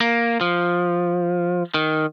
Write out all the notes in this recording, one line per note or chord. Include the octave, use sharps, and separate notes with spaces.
A#3
F3
D#3